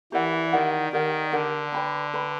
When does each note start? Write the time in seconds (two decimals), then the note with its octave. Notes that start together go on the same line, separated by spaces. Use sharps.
0.12 E3 G4 A#4 D5 F#5
0.52 D#3 G4 A#4 D5 F#5
0.93 D#3 G4 A#4 D5 F#5
1.32 D3 G4 A#4 D5 F#5
1.72 B4 D5 G5 B5
2.14 B4 D5 G5 B5